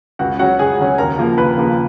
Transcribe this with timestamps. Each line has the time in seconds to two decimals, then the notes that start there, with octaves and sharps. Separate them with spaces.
0.19 C#2 F#4 F#5
0.39 C#3 F#3 C#4 F#4 F#5
0.59 C#2 G#4 G#5
0.79 C#3 F#3 C#4
0.98 D#2 A#4 A#5
1.18 C#3 F3 A#3
1.38 D#2 B4 B5
1.58 C#3 F3 A#3